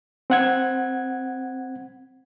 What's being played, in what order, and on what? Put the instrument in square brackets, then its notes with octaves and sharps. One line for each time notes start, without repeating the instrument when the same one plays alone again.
[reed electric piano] C4 F#5 G#6